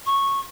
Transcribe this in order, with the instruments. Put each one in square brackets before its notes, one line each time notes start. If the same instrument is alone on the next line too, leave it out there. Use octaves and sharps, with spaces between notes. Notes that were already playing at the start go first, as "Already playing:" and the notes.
[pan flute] C#6